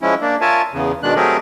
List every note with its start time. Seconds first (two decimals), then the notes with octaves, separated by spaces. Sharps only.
0.01 F3 G#3 C#4 E4
0.21 A#3 D4
0.41 F4 A#4 C#5 E5 G#5 A5
0.73 E2 C#3
1.03 B2 D#3 G#3 D4 F#6
1.16 F#3 A3 C4 G4 G#4 A#4